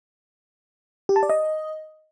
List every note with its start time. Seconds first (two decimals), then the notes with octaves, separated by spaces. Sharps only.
1.09 G4
1.16 A5
1.23 D5
1.29 D#5